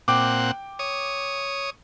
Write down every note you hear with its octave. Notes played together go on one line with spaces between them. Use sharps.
A#2 C4 F#5 G5 D6
C#5 D#6